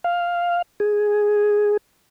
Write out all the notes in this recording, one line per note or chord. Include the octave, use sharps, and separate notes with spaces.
F5
G#4